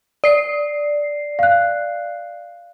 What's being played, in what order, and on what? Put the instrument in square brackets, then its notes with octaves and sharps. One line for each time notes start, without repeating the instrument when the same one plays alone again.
[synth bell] D5 C7
[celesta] F5 F#6